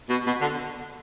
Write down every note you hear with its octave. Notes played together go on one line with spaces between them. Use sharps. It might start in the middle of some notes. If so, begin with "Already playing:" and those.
B2
B2
D3